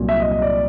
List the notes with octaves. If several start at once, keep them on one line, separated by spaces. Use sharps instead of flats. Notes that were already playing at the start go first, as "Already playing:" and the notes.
Already playing: C2 A#2 F#3
E5
D#5
D#5
D5